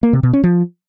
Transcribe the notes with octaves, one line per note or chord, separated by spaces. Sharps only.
A#3
C3
B2
C#4
F3